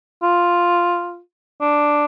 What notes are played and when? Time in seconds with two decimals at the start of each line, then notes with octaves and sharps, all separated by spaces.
0.23 F4
1.61 D4